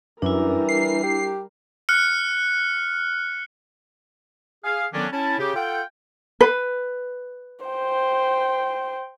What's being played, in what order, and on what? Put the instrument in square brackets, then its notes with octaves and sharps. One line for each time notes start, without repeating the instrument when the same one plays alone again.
[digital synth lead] F#2 [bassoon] E3 [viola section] G3 A#4 [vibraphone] D4 E4
[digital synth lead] C7
[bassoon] G4
[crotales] F6 F#6 C#7
[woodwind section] G#4 F5
D3 D#3 F#3 B3 C#4 D4
C#4 E4 A5
C#3 G4
F4 A4 F#5 G5
[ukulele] B4
[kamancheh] C5 G5